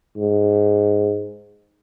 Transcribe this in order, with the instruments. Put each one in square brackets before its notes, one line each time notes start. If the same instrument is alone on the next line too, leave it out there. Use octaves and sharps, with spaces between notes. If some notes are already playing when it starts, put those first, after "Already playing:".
[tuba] G#2